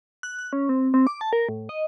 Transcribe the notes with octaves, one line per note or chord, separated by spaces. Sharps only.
F#6
F#6
C#4
C4
C4
D6
A5
A#4
A2
D#5